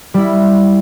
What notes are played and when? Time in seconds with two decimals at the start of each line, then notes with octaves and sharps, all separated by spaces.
0.14 G3 E4